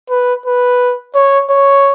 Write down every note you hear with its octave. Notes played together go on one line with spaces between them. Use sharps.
B4
B4
C#5
C#5